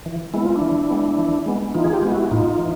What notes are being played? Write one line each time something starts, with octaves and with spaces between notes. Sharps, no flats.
E3
G#3 B3 E4
F4
D4 E4
E3
G#3 B3
E3
G#3 B3
E3 D#4 F4
G#4
F4 G4
G#3 B3
E4 F#4
A2 D#4 F4
E3